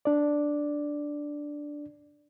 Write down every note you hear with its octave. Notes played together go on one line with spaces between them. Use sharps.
D4 D5